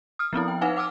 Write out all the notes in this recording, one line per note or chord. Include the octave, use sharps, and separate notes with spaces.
D#6 F6
F3 B3 C4 E4
G5
D#4 B4 F5 F#5 G#5
F#5 D6 E6 F6